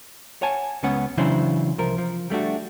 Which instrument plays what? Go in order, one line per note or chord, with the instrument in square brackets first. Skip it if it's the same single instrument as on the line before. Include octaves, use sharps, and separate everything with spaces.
[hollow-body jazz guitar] C#5 F#5 G#5 A5
C#2 G#3 B3 C#4 F#5
C#3 E3 F#3 D4 E4 C5
C2 F3 A#4
F3
G3 A3 D4 F#4